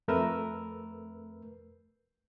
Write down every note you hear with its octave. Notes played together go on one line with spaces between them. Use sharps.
F2 A3 A#4 B4 E6